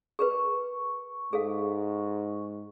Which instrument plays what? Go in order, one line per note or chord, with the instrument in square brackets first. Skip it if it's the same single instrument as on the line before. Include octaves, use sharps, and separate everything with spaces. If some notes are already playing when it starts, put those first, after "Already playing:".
[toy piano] G#4 A#4 B4 [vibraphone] C#6
[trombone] G#2 [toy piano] G#4 A4 F5